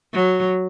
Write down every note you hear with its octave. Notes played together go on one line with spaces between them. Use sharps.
F#3